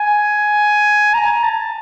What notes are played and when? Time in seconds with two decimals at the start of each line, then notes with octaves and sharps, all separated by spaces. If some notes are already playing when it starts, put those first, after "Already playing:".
Already playing: G#5
1.14 A#5
1.43 A5